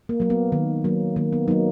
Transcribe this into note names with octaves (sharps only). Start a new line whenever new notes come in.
A#3
F#3 A#3
B3
D#3
F#3 A#3
D#3 A#3
B3
F#3 A#3 D#4